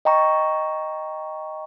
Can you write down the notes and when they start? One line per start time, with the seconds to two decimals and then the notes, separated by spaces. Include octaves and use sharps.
0.05 D#5 G5 A#5 C#6